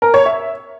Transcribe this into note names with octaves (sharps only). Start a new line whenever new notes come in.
A#4
C#5
E5